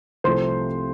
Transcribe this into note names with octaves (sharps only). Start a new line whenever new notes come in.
C2 C3 F3 A3 C5 C6